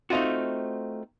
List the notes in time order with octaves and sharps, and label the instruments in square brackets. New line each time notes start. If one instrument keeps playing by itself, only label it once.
[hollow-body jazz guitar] A3 C4 D#4 F4 F#4